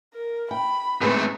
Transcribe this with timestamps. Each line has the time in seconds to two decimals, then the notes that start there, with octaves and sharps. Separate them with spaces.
0.14 A#4
0.51 G5 B5
1.01 G#2 A3 B3 C4